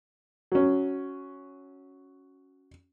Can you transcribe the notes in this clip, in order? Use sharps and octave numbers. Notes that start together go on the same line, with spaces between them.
F#3 C#4